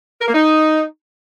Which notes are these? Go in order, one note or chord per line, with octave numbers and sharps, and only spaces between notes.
A#4
A#3
D#4